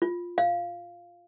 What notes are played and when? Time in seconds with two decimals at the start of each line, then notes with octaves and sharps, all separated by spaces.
0.02 F4
0.38 F5